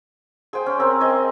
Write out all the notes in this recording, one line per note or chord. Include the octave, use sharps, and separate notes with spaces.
G#4 C5 G5
C#4
C4 A#4
D#5 G#5